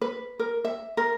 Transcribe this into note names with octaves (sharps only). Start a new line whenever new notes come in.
B4
A#4
E5
A#4